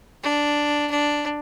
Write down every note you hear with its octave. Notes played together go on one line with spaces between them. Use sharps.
D4
D4